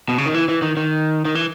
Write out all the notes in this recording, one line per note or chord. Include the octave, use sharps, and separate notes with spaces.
B2
C#3
D#3
E3
E3
D#3
D#3
D#3
E3